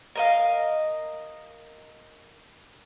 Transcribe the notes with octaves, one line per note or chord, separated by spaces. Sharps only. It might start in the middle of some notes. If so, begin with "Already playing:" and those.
A#4 D#5 F5